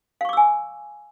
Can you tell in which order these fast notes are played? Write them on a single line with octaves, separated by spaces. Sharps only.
F5 C#6 D6 E6 G#5